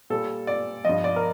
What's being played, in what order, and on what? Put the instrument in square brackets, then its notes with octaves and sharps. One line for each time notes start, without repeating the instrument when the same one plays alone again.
[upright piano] A#2 G3 A4
D5
G2 F3 D#5
D5
A#4